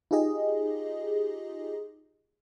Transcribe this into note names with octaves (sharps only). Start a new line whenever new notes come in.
D#4 F4 G4 G#4 D#5